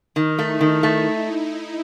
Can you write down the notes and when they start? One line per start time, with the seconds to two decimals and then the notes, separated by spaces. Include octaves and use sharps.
0.16 D#3 D#4
0.39 A3
0.46 E4
0.61 D#3
0.83 A3